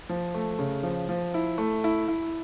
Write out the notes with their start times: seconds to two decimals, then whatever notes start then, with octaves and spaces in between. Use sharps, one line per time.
0.09 F3
0.34 A3
0.59 C#3
0.83 F3
1.09 F3
1.34 E4
1.58 A3
1.84 E4
2.08 E4